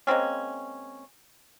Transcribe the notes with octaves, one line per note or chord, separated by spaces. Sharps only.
G#3 A#3 C4 C#4